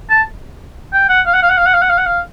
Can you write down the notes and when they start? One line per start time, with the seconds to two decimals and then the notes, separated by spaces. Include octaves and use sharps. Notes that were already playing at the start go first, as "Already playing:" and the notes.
0.10 A5
0.93 G5
1.09 F#5
1.26 F5
1.34 F#5
1.43 F5
1.50 F#5
1.58 F5
1.66 F#5
1.74 F5
1.82 F#5
1.90 F5
1.98 F#5
2.06 F5